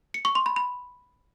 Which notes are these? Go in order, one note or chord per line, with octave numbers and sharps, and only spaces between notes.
C#7
C#6
C6
B5
B5